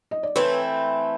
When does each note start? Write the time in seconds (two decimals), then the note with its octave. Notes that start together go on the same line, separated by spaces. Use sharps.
0.11 D#5
0.23 D5
0.35 E3 A3 C4 E4 B4 C#5